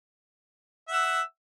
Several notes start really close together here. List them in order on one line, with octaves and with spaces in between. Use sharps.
E5 F#5 E6